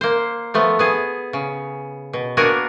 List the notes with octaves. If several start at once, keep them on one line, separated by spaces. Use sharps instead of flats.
A#3 C5
F3 A3 B3
B3 G#4
C#3
B2
A#3 B3 D4 F#4 A#4 G#5